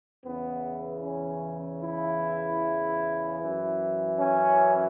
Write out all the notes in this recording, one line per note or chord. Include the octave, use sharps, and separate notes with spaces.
E2 C#3 E3 B3
C#4
E4
F#2 E3
C#4